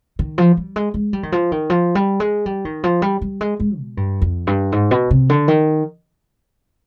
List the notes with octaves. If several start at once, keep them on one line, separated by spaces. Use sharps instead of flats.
D#3
F3
G3
G#3
G#3
G3
D#3
F3
D#3
F3
G3
G#3
G3
D#3
F3
G3
G3
G#3
G#3
B2
G2
F2
G2
G#2
B2
C3
D3
D#3